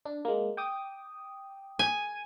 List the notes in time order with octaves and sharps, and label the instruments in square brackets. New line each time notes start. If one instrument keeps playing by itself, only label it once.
[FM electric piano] D4
G#3 A#3
G5 D6 D#6
[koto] G#5